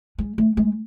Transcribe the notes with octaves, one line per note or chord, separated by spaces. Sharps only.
G#3
A3
G#3